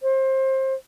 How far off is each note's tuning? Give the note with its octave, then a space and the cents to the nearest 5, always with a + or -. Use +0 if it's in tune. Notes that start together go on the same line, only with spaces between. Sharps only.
C5 +25